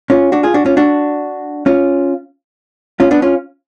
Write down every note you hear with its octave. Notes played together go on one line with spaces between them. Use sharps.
C#4 F4
D4 F#4
F4 G#4
D4 F#4
C#4 F4
D4 F#4
C#4 F4
C#4 F4
B3 D4
C#4 F4